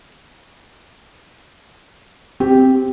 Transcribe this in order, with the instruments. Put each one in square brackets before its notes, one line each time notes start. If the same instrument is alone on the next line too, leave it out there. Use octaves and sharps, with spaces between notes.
[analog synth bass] C4 [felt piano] G4